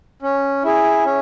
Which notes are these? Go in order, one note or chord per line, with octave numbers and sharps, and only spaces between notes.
C#4
E4 G#4
C#4